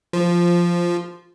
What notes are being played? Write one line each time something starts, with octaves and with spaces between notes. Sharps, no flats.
F3